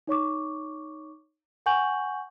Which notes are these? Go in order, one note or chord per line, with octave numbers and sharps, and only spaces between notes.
D#4 C#5 C#6 D6
F#5 G#5 C#6 G6 F#7